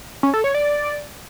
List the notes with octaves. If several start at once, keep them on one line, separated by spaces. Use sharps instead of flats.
C#4
A4
C#5
D5